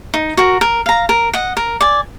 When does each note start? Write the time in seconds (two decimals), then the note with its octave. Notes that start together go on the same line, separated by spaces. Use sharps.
0.14 D#4
0.37 F#4 A#4
0.61 A#4
0.86 F5 A#5
1.09 A#4
1.33 D#5 F#5
1.57 A#4
1.81 D5 G#5